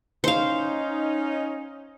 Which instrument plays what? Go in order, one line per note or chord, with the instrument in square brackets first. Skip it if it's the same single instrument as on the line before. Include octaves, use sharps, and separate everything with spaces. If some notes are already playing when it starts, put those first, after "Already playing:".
[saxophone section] C#4 D#4 [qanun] C5 F5